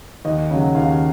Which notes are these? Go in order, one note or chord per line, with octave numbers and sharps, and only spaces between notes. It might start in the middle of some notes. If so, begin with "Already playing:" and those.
D#2 D#5
C#3 F#3
D#2 F5